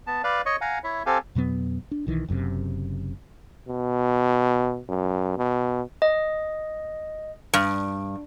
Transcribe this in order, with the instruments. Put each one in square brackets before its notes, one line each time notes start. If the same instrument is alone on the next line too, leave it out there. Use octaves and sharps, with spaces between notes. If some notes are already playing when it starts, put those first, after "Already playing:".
[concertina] B3 A5
B4 D5 F5
C#5 D#5 C#6
F5 F#5 G#5 A#5
E4 C#5 E5
C4 G4 A4 F5 G#5
[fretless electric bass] F2 B2 F#3 B3
D4
B1 D#3 E3
F#1 F#2 A2 C3
[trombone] B2
F#2
B2
[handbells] D#5
[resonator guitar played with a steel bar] G2